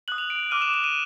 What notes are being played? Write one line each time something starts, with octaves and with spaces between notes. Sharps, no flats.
D#6 F#6 F#7
F7
D7
D6 F6 D#7
E7
E7
D#7